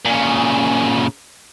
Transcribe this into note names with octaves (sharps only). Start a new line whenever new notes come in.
A#2 C#3